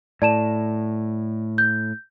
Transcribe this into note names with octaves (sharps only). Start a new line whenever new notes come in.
A2 D5 A5 E7
G6